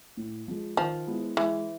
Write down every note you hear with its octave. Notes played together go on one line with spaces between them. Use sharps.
A2
F3 G#3
D#3 F3
G#3 B3 E4
E3 G#3